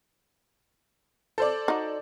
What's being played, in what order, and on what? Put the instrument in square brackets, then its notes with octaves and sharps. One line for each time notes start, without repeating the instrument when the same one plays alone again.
[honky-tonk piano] A4 C5 D5
[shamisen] D#4 F#4